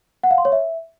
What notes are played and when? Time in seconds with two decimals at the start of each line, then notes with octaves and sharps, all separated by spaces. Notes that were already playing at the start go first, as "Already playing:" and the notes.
0.23 F#5
0.31 F5
0.38 C6
0.45 C#5
0.52 E5